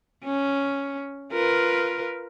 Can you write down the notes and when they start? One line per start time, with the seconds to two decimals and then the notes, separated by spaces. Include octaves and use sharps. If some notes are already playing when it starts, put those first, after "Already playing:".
0.24 C#4
1.32 F4 A#4 B4